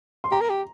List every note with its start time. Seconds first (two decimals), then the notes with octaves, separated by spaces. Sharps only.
0.24 C6
0.32 G4 A#5
0.41 A#4
0.50 G4